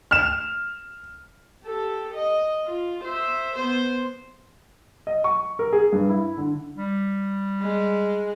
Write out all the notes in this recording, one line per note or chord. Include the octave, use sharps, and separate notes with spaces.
F6 E7
G4 A4
D#5
F4
C5 E5
B3 C5
D#5
C#6
A#4
G#4
G2
E4
D3
G3
G#3